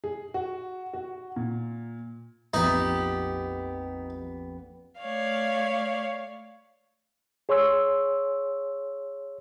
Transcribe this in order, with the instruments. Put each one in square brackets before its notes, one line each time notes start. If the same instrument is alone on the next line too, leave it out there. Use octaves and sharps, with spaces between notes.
[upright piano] G#4
F#4
F#4
A#2
[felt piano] A#1 F2 [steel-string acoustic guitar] B3 G4 [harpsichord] D#4
[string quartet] A3 C#5 D5 F5
[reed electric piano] G#4 C#5 C6 C#6 E6